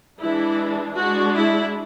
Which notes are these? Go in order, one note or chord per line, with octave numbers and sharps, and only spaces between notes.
E3 G#3 D4 E4
G#3 D4 F#4
E4